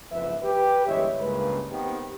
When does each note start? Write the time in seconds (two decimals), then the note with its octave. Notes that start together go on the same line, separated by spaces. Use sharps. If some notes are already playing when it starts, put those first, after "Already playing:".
0.12 F#1 F2 G#2 F3 B4 E5
0.42 G4 B4
0.87 G1 E3 G#3 C#5 D#5 E5
1.20 C#2 G2 C#3 G#3 A#3 B4
1.71 D#2 D#3 B3 C4 G4